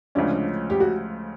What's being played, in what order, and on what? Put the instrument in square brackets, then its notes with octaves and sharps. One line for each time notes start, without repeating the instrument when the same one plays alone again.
[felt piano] D2 C#3 F3 G#3 C#4 [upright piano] D4
[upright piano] G4
F#4